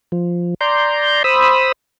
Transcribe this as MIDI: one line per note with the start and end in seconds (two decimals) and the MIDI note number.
0.12 0.54 53
0.61 1.23 74
0.61 1.23 82
0.61 1.23 84
0.61 1.23 91
1.24 1.72 72
1.24 1.72 83
1.24 1.72 87
1.24 1.72 88